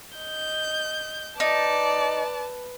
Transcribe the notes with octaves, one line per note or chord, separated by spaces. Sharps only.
D#5 G6
D#4 B4 D5 A5